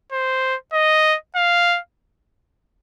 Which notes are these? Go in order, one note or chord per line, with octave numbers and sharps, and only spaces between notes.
C5
D#5
F5